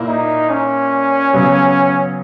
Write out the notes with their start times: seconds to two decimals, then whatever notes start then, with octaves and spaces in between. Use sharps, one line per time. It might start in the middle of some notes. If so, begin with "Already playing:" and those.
Already playing: A#2 A#3 E4
0.08 D#4
0.50 C#4
1.33 C#3 F#3 B3